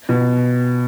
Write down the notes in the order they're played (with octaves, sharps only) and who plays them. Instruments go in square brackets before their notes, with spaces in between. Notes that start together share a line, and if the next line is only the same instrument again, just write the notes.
[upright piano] B2